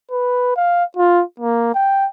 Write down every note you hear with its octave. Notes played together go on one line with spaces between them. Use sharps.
B4
F5
F4
A#3
G5